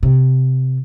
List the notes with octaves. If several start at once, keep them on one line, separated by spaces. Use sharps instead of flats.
C3